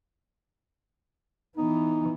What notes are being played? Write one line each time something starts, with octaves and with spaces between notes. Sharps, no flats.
E3 B3 D#4